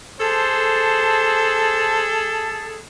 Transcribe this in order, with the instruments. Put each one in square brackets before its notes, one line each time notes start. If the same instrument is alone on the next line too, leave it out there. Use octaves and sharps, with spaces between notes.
[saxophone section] G#4 A4 [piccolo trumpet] C5 [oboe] A5